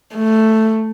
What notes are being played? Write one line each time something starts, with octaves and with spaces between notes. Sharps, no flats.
A3